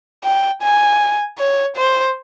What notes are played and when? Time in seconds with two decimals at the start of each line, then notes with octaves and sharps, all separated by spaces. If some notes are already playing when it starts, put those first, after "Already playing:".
0.24 G5
0.62 G#5
1.38 C#5
1.77 C5